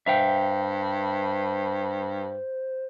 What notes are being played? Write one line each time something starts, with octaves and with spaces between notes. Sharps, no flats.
G2 C5 E5 F5 G5